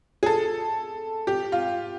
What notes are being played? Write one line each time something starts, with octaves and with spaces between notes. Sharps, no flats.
G#4
A4
G4
F4